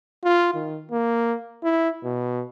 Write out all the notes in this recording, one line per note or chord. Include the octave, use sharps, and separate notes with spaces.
F4
D#3
A#3
E4
B2